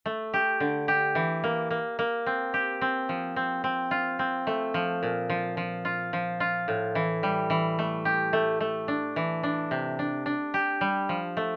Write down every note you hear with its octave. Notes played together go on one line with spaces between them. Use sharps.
A3
G4
D3
G4
E3
A#3
A#3
A#3
C4
G4
C4
F3
C4
C4
F4
C4
A3
F3
A#2
F3
F3
F4
F3
F4
A2
E3
G3
E3
A3
G4
A3
A3
D4
E3
D4
C3
D4
D4
G4
G3
F3
A3